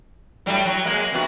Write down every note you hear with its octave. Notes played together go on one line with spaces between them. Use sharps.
A2 F#3 G3
F#3
G#3 A#3
C3 B3 F#4